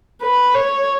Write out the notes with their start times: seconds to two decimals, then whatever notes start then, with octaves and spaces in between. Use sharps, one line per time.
0.22 B4
0.55 C#5